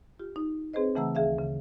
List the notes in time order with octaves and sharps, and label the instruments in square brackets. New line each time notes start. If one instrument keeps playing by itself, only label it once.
[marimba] F4 G4
D#4
C4 G#4 B4 C5 D#5
C#3 E3 A3 F#5 A#5 E6
D2 D#3 G#4 E5 F5
C#3